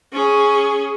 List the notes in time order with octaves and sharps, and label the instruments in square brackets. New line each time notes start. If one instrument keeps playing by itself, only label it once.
[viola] C#4 G#4